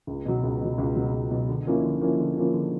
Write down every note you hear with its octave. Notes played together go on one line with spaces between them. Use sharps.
C#2
B2 F#3
C#2
B2 F#3
C#2
B2 F#3
C#2
B2 F#3
D3
F3 A#3 C#4 E4
D3
F3 A#3 C#4 E4
D3
F3 A#3 C#4 E4
D3